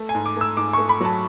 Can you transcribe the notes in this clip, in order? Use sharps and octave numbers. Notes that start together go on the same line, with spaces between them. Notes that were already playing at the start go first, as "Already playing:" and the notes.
Already playing: A3
G#5
G#2
D6
A3 E6
G#2 D6
C#6
A3
B5
F#3 A5